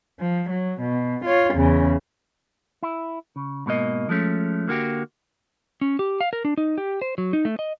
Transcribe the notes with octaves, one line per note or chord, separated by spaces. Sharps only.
F3
F#3
B2
F4 C#5
E2 C#3
E4
C#3
G#2 B2 A#3 D#5
F3 G#3 A3 C#4
D3 A#3 F#4 G4
C#4
G4
F5
A#4
D4
D#4
G4
C5
F#3
D#4
A3
D#5